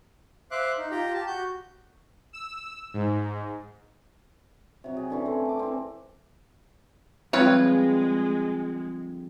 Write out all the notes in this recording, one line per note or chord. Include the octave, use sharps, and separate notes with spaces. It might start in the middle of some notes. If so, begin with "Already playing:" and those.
C5 E5 F5 D6 F#6
D#4
F4 G4 G5 A#5
G4 A5
F#4 G6
E6
G#2
C3 F#3
G#4 D#5
D3 E3 C#4
A3 C4
A#4 D6
E3 C4
D3 F3 G3 G#3 C4 F4 B4 C#5